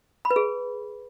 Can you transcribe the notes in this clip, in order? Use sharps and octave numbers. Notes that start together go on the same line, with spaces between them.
B5
B4
G#4